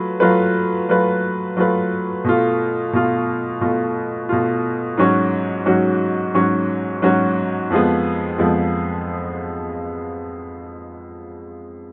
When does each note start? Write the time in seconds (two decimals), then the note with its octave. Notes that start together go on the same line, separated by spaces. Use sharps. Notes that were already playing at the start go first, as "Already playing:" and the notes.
Already playing: F#3 A3 F4 B4
0.20 F#3 A3 F4 B4
0.89 F#3 A3 F4 B4
1.57 F#3 A3 F4 B4
2.24 B2 A3 F4
2.93 B2 A3 F4
3.61 B2 A3 F4
4.29 B2 A3 F4
4.98 G#2 F#3 C#4 F#4
5.66 G#2 F#3 C#4 F#4
6.34 G#2 F#3 C#4 F#4
7.02 G#2 F#3 C#4 F#4
7.70 F2 F3 G#3 B3
8.38 F2 F3 G#3 B3